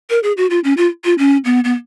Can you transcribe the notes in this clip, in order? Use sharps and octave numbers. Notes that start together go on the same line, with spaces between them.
A#4
G#4
F#4
F4
C#4
F4
F4
C#4
B3
B3